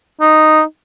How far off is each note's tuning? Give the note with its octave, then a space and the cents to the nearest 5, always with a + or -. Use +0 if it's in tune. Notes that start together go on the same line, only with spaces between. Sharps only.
D#4 -5